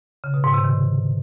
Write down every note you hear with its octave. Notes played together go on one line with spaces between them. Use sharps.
C#3
B2
G#2
C3
D#3